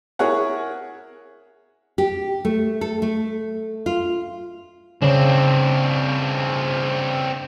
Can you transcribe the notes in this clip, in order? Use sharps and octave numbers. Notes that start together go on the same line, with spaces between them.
E4 G#4 A#4 C#5 F#5
G4
A3
A4
A3
F4
C#3 C4 D4 C#5